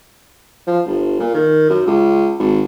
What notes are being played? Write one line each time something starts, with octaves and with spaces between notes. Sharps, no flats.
F3
G1
A#2
D#3
F#2
C#2
G#1